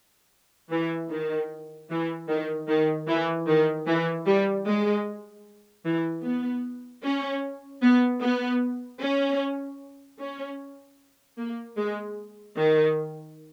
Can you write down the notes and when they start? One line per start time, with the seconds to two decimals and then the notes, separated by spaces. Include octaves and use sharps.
0.71 E3
1.11 D#3
1.90 E3
2.29 D#3
2.68 D#3
3.08 E3
3.47 D#3
3.87 E3
4.26 G3
4.67 G#3
5.85 E3
6.23 B3
7.03 C#4
7.82 B3
8.22 B3
9.01 C#4
10.19 C#4
11.37 A#3
11.77 G#3
12.56 D#3